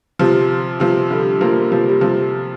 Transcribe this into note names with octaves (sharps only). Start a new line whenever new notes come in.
C3 F3
C3 F3
D3 G3
F3 A#3
C3 F3
G3
C3 F3